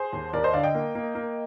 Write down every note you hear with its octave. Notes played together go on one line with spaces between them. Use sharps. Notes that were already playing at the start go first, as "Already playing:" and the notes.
Already playing: G#4 C5
D#2
D#2 A#4 D5
C5 D#5
D3 D5 F5
D#5 G5
A#3
A#3
A#3